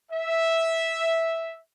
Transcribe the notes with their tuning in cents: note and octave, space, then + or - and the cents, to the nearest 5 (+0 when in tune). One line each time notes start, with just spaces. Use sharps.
E5 -5